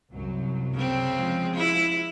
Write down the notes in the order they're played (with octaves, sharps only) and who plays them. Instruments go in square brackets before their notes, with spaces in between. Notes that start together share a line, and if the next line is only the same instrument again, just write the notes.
[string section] C2 F#2 F#3
[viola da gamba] C#3 C4
[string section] F3 G#3
[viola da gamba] E4